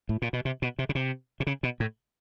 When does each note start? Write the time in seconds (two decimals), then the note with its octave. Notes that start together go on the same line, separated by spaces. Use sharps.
0.09 A2
0.22 A#2
0.33 B2
0.45 C3
0.62 B2
0.79 C3
0.89 C#3
0.95 C3
1.40 C3
1.47 C#3
1.63 B2
1.80 A2